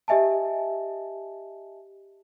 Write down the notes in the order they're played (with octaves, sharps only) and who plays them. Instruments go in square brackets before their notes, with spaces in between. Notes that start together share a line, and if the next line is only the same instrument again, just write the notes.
[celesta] G4 D#5 E5 G#5 A5